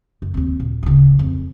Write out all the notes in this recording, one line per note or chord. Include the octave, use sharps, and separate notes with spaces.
F#2
D#2 C4
A#2
D1 C#3
F2